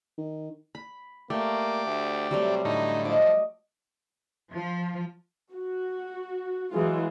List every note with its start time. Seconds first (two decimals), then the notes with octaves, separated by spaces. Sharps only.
0.18 D#3
0.75 B5
1.30 A3 A#3 G4 D5
1.86 D2
2.31 C3 F#3 G3 A3
2.65 A2 D3 D#4
3.05 F3 D#5 D6
4.52 F3
5.52 F#4
6.73 E3 F#3 G#3 F4 G#4